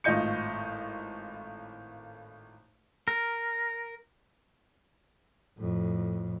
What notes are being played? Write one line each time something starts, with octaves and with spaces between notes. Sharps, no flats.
G#1 A2 F4 D#5 G6 C#7
A#4
F2 A2